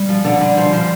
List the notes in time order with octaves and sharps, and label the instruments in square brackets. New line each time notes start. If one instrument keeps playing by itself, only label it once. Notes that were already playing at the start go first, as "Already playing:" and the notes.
Already playing: [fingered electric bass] G3
[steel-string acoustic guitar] F3
D3
D3
F3
F3